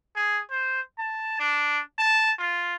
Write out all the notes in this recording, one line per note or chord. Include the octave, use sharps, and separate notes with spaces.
G#4
C5
A5
D4
A5
F4